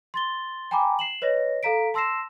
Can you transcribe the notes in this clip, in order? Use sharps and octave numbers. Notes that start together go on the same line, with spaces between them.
C6 A6 G7
G5 G#5 A#5 B5 D6
C7 E7 F#7
B4 C#5 D#5 A#6
A4 F5 A#5 B6 D7
A5 C6 E6 A#6 C7 E7